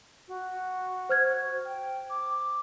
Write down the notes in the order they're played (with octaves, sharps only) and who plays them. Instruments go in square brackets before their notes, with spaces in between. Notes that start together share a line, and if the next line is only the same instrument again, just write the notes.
[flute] F#4
[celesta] C5 F6 G#6
[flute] G5
D6